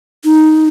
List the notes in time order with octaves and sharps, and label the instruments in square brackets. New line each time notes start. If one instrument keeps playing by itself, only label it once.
[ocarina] D#4